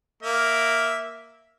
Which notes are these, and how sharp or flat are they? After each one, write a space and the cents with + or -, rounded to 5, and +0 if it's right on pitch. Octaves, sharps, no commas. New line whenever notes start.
A#3 +0 E5 +0